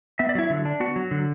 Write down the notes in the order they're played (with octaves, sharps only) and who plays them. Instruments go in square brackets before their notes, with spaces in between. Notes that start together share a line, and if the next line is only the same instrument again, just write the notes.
[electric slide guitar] B3 E5
D5
F#3 E4 E5
D3
D4
B3 F#4 F#5
F#3
D3